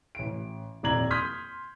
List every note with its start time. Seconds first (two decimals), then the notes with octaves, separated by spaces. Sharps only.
0.15 A1 D7
0.83 D#1 F2 D5 A#5 G#6 F#7
1.10 C6 D#6 F6 G6 G#6 B6